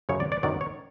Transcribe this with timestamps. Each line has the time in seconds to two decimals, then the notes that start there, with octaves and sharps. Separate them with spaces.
0.09 F#2 C#3 F#3 C#5
0.20 D5
0.32 D5
0.43 F#2 D#3 F#3 D5
0.61 C#5